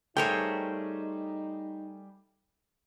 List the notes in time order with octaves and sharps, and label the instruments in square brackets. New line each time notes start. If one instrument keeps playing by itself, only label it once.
[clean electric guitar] G3 G#4 C5 [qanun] A3 A#4 C#5 [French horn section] D#4 [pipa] G5